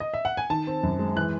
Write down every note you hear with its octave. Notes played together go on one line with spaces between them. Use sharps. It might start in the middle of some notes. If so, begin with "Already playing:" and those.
D#5
E5
F#5
G#5
D#3 A5
C4
F#2
G#3
E3 F#6